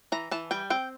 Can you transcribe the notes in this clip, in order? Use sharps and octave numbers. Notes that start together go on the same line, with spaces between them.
E3 A#5
E3 A5
G3 G5
C4 G5